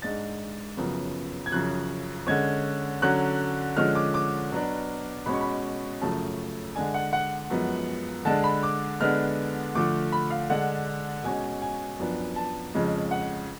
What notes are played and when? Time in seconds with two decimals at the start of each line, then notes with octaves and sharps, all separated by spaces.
0.02 G#2 G#3 D4 A6
0.77 F#2 C#3 F3 B3
1.46 G#6
1.52 F#2 C#3 F3 F#6
2.27 D3 G#3 C#4 G#6
3.02 D3 F#3 C#4 F#6
3.76 D3 F3 G#3 C#4 F6
3.95 D6
4.14 D6
4.52 B2 F#3 B3 D4
5.26 B2 G#3 C#4 B5
5.35 C#6
5.41 B5
6.02 F#2 C#3 F3 A3 A5
6.75 D3 G#3 D4 G#5
6.94 F#5
7.13 F#5
7.50 F#2 F3 G#3 B3
8.25 D3 G#3 D4 A5
8.44 B5
8.63 D6
9.00 D3 G#3 B3 D4 F6
9.75 D3 F3 A3 D6
10.12 B5
10.31 F5
10.50 D3 G#3 D4 F#5
11.24 B2 G#3 C#4 G#5
11.62 G#5
12.00 F#2 F3 B3 D4
12.36 A5
12.75 F2 C#3 F3 G#3
13.11 F#5